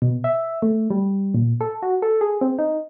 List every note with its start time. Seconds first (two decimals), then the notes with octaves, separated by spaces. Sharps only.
0.02 B2
0.24 E5
0.62 A3
0.90 G3
1.34 A#2
1.61 A4
1.83 F#4
2.02 A4
2.21 G#4
2.41 C4
2.59 D#4